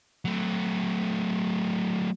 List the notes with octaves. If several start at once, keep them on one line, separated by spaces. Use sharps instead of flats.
F#3 A3